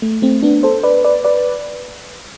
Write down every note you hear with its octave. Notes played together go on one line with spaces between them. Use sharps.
A3
A3 C4
B3 D4
A4 C5
B4 D5
B4 D5
B4 D5